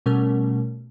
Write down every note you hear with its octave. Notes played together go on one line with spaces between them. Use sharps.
B2 G3 A3 C#4 A#4